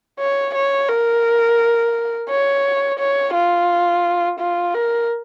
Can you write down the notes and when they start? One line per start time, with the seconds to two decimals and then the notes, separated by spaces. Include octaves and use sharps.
0.20 C#5
0.55 C#5
0.89 A#4
2.30 C#5
3.00 C#5
3.34 F4
4.40 F4
4.74 A#4